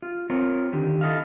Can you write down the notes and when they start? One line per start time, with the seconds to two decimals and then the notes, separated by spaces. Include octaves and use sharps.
0.02 F4
0.30 C4 F4 A#4 C#5
0.72 D3 D#3 G4
1.01 E4 A4 D#5 F5